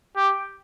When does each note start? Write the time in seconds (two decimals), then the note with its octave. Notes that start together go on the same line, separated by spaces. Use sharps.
0.16 G4